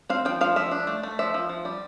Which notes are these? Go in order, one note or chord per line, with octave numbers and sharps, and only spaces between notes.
C4 F5
F3 G5
F3 F5
F3 E5
D4
A3
A3
F3 E5
F3
F3
G3